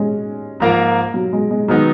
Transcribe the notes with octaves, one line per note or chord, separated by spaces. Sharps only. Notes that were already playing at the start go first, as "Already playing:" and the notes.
Already playing: G#3 C#4
G#2 F3 A#3 F4 A#4
F#3
G#3
G#3
D#3 F#3 G#3 B3 D#4